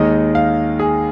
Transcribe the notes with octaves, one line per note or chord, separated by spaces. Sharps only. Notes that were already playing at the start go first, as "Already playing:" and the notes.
Already playing: D#2 D#3 G#3 D#4 D#5
F5
G#4